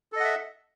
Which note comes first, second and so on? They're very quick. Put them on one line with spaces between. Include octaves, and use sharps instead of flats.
A4 D#5 F#5 E5